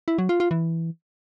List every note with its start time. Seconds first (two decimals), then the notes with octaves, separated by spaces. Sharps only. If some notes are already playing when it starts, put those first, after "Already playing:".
0.08 E4
0.18 F#3
0.29 F4
0.40 F4
0.51 E3